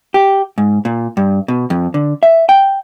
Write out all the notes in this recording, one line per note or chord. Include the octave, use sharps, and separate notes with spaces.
G4
G#2
A#2
G2
B2
F2
D3
E5
G5